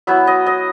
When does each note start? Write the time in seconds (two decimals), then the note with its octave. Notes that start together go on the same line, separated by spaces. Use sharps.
0.07 F#3 B3 E4 E5
0.27 D#5
0.46 D#5